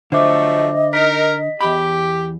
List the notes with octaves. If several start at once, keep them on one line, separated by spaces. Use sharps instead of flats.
D3 F3 F#3 A3 C5 D#5 E5 D6
D#4 A#4 B6
E2 G4 B5